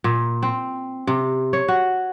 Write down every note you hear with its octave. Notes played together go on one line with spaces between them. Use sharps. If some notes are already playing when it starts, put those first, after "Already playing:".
A#2
C4
C3
C#5
F#4